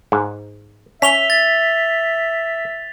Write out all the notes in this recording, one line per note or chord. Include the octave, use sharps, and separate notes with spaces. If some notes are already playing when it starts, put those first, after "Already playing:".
G#2
C#4 E5 B6 F7 G7
A6